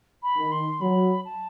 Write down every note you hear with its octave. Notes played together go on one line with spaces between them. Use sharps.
B5
D#3
C6
F#3 B5
A5